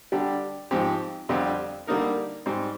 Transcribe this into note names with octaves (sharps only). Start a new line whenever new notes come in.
D3 G3 D4 G4
G#2 F3 C4 G4
F2 D3 G3 C4 G4
D3 G3 A#3 D#4 A#4
G#2 G3 C4